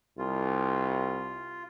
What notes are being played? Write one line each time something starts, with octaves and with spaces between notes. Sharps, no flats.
C2 F4